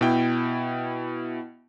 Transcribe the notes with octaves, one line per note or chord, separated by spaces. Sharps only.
B2 E4 G5